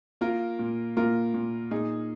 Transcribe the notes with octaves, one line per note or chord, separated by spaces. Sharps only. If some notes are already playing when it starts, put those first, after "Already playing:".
A#3 F4 A#4
A#2
A#2 F4 A#4
A#2
A#2 D#4 G#4